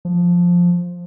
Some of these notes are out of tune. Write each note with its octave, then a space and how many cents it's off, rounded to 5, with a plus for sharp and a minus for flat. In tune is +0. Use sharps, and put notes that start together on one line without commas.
F3 +5